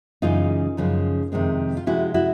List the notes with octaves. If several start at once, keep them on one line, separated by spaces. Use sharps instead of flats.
F#2 C#3 E3 G#3 D#4 F4
F#2 C#3 F3 G#3
F2 C3 D#3 G#3 C4
F4
C3 F3 G#3 C#4 E4 F#4
E4 F#4